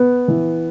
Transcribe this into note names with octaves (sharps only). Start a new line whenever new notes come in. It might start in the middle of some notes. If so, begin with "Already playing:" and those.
Already playing: B3
E3